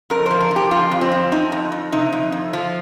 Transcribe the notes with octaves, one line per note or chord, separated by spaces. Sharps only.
F2 A#4
F3 C5
A#4
F3
G4
F2 F4
F2
C4
F3
F3 D#4
F2
F2
C3 D#4
F2
F2
F3 F4